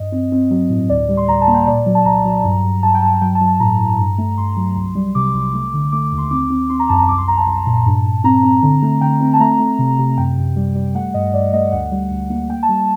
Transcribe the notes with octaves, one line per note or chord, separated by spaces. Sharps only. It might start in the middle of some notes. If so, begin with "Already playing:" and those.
Already playing: G2 D#5
C4
C4
F#3
A2
D2 D5
G3
C6
D2 A#5
A5
A#3
G5
A#2 D5
F#3
A5
C2 A#5
F#3
G2
G2
G2 A5
G5
G2 A5
F#3 G5
A5
F#3
A5
A2 A#5
A2
G2
A3
G2 C6
F#3
C2
G3
C3 D6
C2
A3
D3
A3 D6
D6
D#2
C6
C4 D6
C4
C4 C6
A#5
F#2 A5
A#5
C2 D6
C6
C2 A#5
A5
C2
A#2
G2
G2
C4 A#5
C4
D3
A3
D3 G5
C4
A5
A3 A#5
A3
C3
C3
F#2 G5
F#2
G3
G3
A3 F#5
G2 D#5
G2 D5
A3 D#5
D2 F#5
G3
D2
A#3
A#3 G5
A5
G3